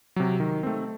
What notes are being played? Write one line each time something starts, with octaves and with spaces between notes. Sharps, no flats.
C3 F#3
D#3
A3 C4